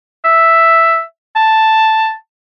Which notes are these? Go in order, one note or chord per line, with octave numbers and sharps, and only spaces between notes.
E5
A5